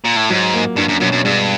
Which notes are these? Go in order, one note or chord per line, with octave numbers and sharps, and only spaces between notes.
A#2
A2
G#2 F#3
A#3
G2 D4
F#2
F#2 B2
F#2
G2 G#3